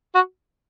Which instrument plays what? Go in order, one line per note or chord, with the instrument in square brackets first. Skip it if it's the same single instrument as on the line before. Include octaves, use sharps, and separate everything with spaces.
[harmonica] F#4